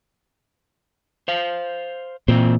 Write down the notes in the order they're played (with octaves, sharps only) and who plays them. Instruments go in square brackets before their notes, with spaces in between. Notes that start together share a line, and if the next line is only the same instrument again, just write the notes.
[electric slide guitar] C5 F5
[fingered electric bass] A#2 [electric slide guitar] E3 C4 C5